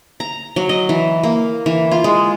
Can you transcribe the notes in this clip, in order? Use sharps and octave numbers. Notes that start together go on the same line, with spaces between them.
A#5
F#3
D#5
E3
A#3
E3
F4
G#3